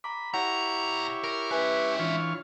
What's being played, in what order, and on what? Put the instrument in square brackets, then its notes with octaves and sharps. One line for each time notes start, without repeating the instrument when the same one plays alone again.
[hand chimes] A#5 D6 [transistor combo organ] B5
[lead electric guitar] B2 A#5 [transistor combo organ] E4 G4 C#5 [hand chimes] F#5 D6 A#6
[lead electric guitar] A#4
[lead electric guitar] G#3 E5 [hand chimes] B4 G#5 F#6
[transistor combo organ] E3 F4 C#5 [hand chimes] D4